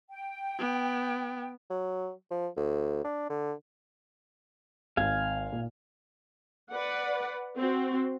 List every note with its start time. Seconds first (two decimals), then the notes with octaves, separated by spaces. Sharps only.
0.10 G5
0.59 B3
1.70 F#3
2.31 F3
2.57 D2
3.04 D4
3.30 D3
4.97 G#1 F5 G#5
5.53 A#2
6.71 B4 D5 F#5
7.57 C4 F#4